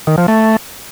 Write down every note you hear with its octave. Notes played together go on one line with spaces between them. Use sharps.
D#3
F3
A3